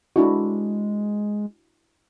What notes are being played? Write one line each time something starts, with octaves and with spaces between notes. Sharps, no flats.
G#3 D4 E4 F#4